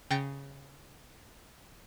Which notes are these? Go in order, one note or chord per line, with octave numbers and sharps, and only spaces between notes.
C#3 G5 G6 A6 A#6 C#7